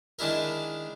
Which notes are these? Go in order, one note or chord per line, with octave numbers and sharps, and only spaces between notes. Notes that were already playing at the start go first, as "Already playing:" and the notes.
D#3 G#3 D4 E4 A#4